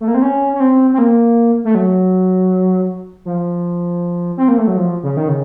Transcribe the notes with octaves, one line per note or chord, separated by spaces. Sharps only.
A3
A#3
C4
C#4
C#4
C4
C4
A#3
A3
F#3
F3
C4
A#3
A3
F#3
F3
C#3
D#3
C#3